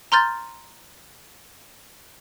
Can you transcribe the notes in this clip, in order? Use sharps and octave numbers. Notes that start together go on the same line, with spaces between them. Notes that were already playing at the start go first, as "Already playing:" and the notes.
A#5 C6 F6 G6 A6